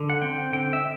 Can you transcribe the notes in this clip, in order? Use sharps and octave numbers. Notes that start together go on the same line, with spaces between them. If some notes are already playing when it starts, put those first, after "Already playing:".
Already playing: D3
F#5
C4 G5
D3 G5
E5